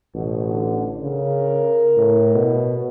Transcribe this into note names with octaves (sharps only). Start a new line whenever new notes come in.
A1 B2
D3
C#3 A#4
A2
B2